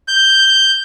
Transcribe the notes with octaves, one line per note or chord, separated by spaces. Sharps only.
G6